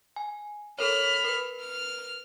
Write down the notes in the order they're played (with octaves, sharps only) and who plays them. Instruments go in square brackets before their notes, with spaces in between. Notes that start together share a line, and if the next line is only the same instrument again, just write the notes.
[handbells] G#5
[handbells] A4 A#4 C#5 [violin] B5 F6
[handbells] A#4 B4
[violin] F6